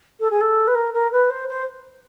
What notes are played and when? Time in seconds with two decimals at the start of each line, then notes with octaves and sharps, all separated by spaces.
0.19 A4
0.30 G#4
0.40 A4
0.67 B4
0.74 A#4
0.93 A#4
1.11 B4
1.29 C5
1.48 C5